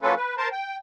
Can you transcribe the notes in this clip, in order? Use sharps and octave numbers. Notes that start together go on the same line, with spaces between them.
F#3 A#3 C#4 F4 A4 B4
B4
A#4 C5 A5
G5